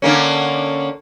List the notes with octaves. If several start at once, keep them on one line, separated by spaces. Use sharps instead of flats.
D3 A#3 C#4